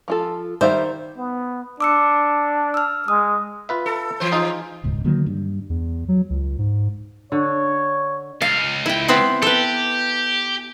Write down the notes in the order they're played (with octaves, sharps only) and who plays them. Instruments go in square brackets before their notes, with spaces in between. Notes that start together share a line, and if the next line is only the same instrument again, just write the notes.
[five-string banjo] F3 F4 A4
[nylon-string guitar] D#3 C5 [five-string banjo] G3 E5 F5
[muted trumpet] B3
[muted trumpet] D4 [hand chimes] D6 E6 C#7
[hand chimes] E6 F6
[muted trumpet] G#3 [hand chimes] D#6
[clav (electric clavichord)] F4 B4 E5
[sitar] A4
E3 C5
[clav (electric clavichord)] D#4 F4 G#4
[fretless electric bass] D#1 C#2 G#2
D3 D#3 F#3 A#3
G2
[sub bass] E2
F#3
C#2
G#2
[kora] D3 [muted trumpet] C#5
[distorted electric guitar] C#2 [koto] F5
[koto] E4 G5
B3 C4 E4
[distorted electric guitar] G4 [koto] A4 B4